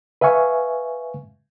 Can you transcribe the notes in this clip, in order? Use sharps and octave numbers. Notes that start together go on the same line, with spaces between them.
B4 E5 F5 G#5 C#6